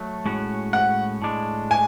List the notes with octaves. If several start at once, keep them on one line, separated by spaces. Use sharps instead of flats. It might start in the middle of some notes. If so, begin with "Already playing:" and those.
Already playing: F#3 A3
A2 G#3 C#4 F#4
F#5
A2 G#3 D4
G#5